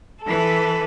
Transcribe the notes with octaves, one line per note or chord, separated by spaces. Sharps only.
E3 A4 B4